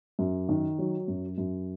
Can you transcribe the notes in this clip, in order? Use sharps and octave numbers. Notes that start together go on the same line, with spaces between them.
F#2
D#3
F#3
F#2
F#2